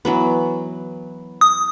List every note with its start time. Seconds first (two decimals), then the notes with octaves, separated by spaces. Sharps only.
0.05 E3 F#3 B3
1.41 D#6